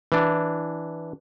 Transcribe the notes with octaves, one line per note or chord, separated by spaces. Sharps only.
E3 D4